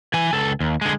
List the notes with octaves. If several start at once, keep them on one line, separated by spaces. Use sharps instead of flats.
E3 G#5
C#2 A4
D#2
D3 G#3